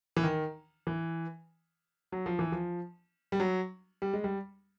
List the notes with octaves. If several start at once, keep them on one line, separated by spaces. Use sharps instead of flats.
E3
D#3
E3
F#3
F3
E3
F3
G3
F#3
G3
G#3
G3